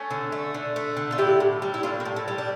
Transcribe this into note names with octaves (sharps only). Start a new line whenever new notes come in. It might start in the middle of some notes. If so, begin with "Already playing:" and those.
Already playing: A3 C#4
D3
A3
D3
A3
D3
F4
A2 E4 G4
A2
G3
E4
A2 D4 F4
A#3
A2
A3
G3
D4